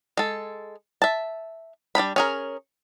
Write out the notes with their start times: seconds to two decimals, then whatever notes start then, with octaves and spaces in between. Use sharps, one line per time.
0.17 G#3 A4
1.02 E5 A5
1.95 G3 D4 D#4 B5
2.16 C#4 G#4 A#4